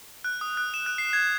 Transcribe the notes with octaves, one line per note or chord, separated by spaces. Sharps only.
F#6
D#6
F#6
E7
F#6
C7
G#6